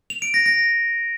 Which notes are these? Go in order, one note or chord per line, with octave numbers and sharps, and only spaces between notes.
F7
D7
A#6
A#6